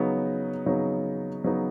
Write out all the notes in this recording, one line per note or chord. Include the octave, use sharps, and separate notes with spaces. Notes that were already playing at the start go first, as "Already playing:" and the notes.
Already playing: C#3 F#3 B3 D#4
C#3 F#3 B3 D#4
C#3 F#3 B3 D#4